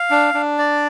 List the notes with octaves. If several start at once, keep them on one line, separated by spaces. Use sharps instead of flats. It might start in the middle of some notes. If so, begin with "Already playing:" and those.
Already playing: F5
D4
D4
D5